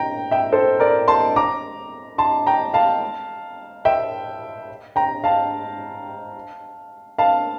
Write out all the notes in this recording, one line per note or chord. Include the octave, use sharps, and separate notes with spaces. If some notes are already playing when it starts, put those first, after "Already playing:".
Already playing: G5 A#5
E5 G5
A4 C5
A#4 D5
A5 C6
A#5 D6
A5 C6
G5 A#5
F5 A5
E5 G5
G5 A#5
F5 A5
F5 A5